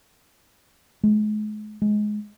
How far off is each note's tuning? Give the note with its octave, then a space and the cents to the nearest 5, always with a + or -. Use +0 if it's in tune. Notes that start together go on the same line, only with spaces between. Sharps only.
G#3 +40
G#3 +15